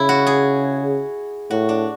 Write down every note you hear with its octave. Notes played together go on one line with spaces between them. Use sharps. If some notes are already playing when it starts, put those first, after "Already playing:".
Already playing: C#3 E4
F#4
G#4
A2 F#4
D4